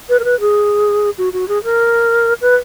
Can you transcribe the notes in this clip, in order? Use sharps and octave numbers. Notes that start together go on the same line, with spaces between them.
B4
A#4
B4
G#4
F#4
F#4
G#4
A#4
B4